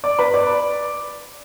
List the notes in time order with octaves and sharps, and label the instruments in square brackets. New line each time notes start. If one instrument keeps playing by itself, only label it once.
[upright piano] D5 D6
B4 B5
D5 D6